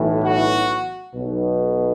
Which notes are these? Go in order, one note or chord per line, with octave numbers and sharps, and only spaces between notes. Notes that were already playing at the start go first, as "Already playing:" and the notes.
Already playing: B1 A2 E3
F#4
B1 B2